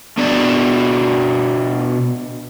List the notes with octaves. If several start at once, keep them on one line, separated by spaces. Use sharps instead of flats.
B2 D4